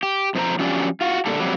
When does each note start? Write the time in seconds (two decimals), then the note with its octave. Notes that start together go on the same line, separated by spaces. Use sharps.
0.03 G4
0.35 F2 F3 D4 C5 A#5
0.59 F3 F#3 C#4 D4 G4 D5
1.01 F4 F#4
1.26 A#2 D3 G3 A4
1.39 F2 F#3 G3